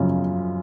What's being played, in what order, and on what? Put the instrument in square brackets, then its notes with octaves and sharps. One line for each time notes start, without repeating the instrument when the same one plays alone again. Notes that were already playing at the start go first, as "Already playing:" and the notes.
Already playing: [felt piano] F#2 C#3 F3 C#4